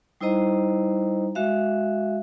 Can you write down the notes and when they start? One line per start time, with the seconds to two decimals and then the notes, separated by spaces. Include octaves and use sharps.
0.21 G3 D#4 E4 C5 D#5 A#5
1.35 G#3 F#4 E5 F5